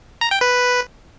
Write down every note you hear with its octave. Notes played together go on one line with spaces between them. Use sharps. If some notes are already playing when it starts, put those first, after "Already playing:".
A#5
G5
B4